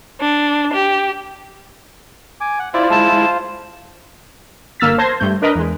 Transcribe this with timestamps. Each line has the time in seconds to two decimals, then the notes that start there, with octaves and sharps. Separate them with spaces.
0.20 D4
0.73 G4
2.41 G#5 D6
2.59 F#5
2.74 E4 F4 C5 D5
2.90 G#3 E4 A5
4.80 G1 A#3 E6 F6 A6 B6
4.98 C5 A5 C6 G#6 A#6
5.20 G2 A3 G6
5.42 D4 A#4 B4 D#5 A#5 B5
5.55 E2 G#3